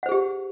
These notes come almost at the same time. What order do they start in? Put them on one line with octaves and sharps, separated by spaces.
F#5 C5 G#4 G4